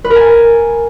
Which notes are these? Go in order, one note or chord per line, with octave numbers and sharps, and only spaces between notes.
B4
A#4
G#5